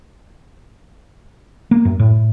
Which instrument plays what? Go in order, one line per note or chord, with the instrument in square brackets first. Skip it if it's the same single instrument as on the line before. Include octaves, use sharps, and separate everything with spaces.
[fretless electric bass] A#3
F#2
A2